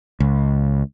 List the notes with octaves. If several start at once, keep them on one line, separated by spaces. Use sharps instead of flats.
C#2